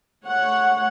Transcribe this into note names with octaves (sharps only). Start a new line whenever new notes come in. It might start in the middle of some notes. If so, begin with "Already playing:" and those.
A3 C#5 F#5